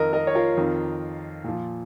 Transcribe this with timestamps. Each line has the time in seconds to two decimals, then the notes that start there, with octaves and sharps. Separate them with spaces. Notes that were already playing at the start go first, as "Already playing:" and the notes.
Already playing: F2 D#3 A#4 D#5
0.13 A#4 D#5
0.27 C#5
0.35 F4 A#4
0.57 F2 D#3
1.44 A#2 F3